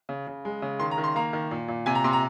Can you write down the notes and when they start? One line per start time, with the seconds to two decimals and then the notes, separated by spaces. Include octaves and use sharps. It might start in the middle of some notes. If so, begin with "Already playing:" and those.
0.09 C#3
0.27 C#3
0.45 G#3
0.62 C#3
0.80 D#3 C6
0.91 A#5
0.98 D#3
1.04 C6
1.16 A#3 A#5
1.33 D#3
1.51 A#2
1.68 A#2
1.86 C3 G#5
1.95 A#5
2.04 C3 C6
2.13 A#5